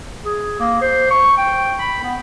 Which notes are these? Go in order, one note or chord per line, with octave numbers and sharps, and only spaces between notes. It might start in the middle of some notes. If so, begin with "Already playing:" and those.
G#4
A#3
C5
C#6
G5
B5
B3